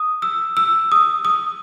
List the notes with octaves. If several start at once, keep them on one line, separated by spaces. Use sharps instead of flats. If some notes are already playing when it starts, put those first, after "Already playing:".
Already playing: D#6
E6
E6
D#6
D#6